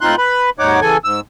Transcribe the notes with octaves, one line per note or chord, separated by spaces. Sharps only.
A2 C4 D#4 F4 C6 F#6
B4 B5
D#2 G#2 D#4 C#5 F#5 D6
C#3 E3 A4 G#5
G#2 E6